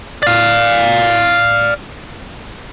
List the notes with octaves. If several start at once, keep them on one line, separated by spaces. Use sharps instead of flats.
D5 F5